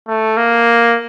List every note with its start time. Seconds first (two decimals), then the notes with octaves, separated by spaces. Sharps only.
0.08 A3
0.37 A#3